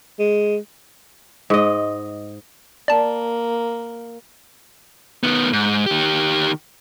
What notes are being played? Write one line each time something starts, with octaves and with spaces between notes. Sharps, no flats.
G#3
G#2 D#5
A#3 D5 A5
D#3 B3
G#2
D#3 G4